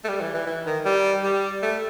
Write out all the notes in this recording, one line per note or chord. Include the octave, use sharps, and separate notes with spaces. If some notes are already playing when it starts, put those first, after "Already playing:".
A3
G3
E3
E3
E3
D#3
G3
G3
A3